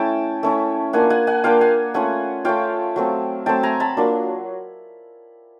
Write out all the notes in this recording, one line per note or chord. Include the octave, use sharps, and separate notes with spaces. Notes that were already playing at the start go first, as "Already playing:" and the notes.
Already playing: A3 C#4 E4 G5 A5
A3 C#4 E4
A#3 D4 F4 F#5 G#5
F#5 G#5
F#5 G#5
A#3 D4 F4 F5 G5
F#5 G#5
A3 C#4 F4 F#5 G#5
A3 C#4 F4 F5 G5
F#3 A3 C4
F#3 A3 C4 G5 A5
G#5 A#5
A5 B5
F#3 A#3 D4 F4